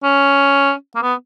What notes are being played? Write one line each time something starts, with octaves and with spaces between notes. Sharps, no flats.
C#4
A#3
B3